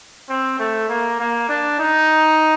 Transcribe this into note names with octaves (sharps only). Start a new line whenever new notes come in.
C4
A3
A#3
A#3
D4
D#4